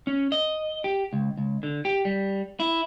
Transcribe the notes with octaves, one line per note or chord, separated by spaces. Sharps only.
C#4
D#5
G4
C#2
C#2
D3
G4
G3
E4